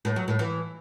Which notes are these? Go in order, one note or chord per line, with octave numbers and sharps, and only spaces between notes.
A2
F#3
A2
E3